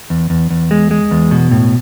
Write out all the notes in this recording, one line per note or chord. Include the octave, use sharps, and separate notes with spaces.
E2
E2
E2
G#3
G#3
E2
B2
A2